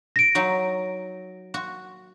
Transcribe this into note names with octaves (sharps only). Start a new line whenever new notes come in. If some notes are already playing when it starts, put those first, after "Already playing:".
A#6 D7
F#3 D#4 F#4
F#4